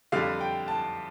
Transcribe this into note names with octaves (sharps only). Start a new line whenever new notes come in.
F2 D3 G3 F5
G5
A5